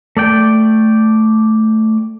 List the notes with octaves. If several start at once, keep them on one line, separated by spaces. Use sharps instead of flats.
A3 D5 G5